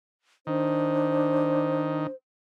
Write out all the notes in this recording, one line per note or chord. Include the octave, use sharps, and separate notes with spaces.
D#3 D4 C5